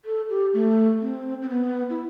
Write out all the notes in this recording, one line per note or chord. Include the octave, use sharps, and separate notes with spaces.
A4
G4
A3
C4
C4
B3
E4